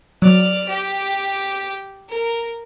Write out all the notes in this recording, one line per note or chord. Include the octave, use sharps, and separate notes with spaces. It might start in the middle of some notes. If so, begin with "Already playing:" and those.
F#3 D5 F6
G4
A#4